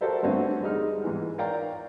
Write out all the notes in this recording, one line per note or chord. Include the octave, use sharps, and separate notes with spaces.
F#4 G4 A4 A#4 C5 E5
G2 D3 A3 C4 C#4 F#4
G3 G#3 D#4 F6
G#2 E3
A#4 C#5 D5 F5 G5 A#5